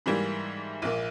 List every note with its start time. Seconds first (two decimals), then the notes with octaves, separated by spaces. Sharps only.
0.06 G#2 E3 G3 A#3 E4
0.82 A#1 A#2 A#3